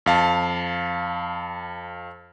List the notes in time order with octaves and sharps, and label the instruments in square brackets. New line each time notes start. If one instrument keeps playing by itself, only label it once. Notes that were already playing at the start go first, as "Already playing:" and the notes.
[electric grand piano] F2 F5 A5